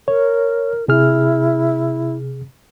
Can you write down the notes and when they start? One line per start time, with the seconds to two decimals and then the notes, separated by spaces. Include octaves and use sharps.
0.08 A#4 C#5
0.88 C3 E4 G#4 F6